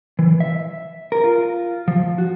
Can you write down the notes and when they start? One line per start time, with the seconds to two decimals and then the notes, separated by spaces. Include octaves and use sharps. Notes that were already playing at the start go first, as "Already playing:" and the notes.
0.19 E3
0.40 E5
1.12 A#4
1.24 F4
1.88 F3
2.18 F#4